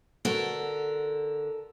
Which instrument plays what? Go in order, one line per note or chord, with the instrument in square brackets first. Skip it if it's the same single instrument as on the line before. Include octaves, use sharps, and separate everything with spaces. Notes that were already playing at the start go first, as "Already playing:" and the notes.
[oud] D3 F#4 [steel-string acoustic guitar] A4 A#4